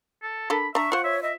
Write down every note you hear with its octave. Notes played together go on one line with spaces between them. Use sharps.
A4
D4 A4 A#4 B5
D4 E5 A#5 C#6
F4 C5 F#5
C#5 E5
D#5 E5